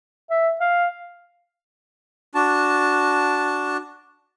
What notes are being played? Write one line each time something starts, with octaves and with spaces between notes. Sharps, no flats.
E5
F5
D4 F#4 A5